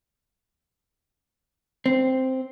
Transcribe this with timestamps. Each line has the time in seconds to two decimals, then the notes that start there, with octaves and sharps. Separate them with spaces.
1.86 C4